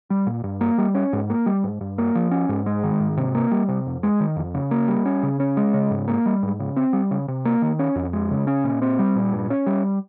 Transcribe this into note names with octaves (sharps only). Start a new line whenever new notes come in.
G3
A#2
G2
A#3
G3
C#4
G#2
A#3
G3
G#2
G2
A#3
F3
C#4
G#2
G#3
D#3
G#2
C3
A#3
G3
C3
F2
G#3
D#3
F2
C#3
A#3
G3
C#4
C#3
C#4
G#3
C#3
G#2
A#3
G3
G#2
C#3
C4
G3
C#3
C3
A#3
D#3
C#4
F2
G#3
C#3
C#4
A#2
C4
G3
A#2
G2
C#4
G3